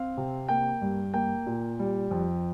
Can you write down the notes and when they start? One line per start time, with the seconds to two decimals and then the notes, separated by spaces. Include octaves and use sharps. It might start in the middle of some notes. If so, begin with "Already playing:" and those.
Already playing: C4 F5
0.17 C3
0.48 A#3 G5
0.81 G2
1.14 A#3 G5
1.46 A#2
1.79 G3
2.11 F2